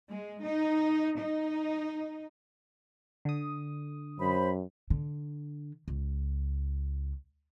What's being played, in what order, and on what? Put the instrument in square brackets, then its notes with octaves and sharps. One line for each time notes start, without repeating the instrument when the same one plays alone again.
[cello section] G#3
D#4
D#4
[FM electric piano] D3 D#6
[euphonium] F#2 [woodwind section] C5 B5
[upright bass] D3
C#2